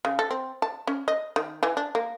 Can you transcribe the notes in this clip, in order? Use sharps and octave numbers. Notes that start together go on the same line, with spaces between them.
C#3
A4
C4
A5
C#4
D#5
D#3
E3
D4
A#3